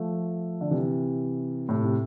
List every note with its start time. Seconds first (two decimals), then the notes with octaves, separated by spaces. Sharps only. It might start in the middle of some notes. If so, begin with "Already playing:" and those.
Already playing: F3 A3
0.61 D3
0.71 C3 E3
1.69 A2 C3
1.84 C3